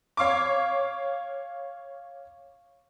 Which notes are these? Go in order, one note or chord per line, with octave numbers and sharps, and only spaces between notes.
C#5 F5 C#6 D6